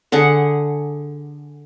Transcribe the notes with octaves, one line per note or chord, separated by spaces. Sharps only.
D3 G#4 F#5